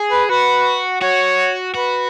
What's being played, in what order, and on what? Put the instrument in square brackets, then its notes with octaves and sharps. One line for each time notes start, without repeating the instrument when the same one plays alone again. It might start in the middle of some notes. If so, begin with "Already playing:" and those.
Already playing: [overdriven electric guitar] G#4
[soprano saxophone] B4
[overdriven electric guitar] F#4 [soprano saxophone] B4
[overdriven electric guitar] F#4 [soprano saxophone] C#5
[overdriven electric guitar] F#4 [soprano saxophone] B4